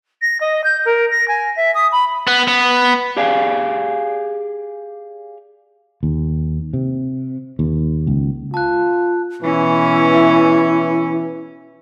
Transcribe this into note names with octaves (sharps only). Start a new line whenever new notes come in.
A#6
D#5
G6
A#4
A#6
G#5
E5
D#6
B5
B3
B3
G4 G#4 D5 F5 G#5
D#2
C3
D#2
C#2
F4 A5 F#6
B2 E3 C#4 E4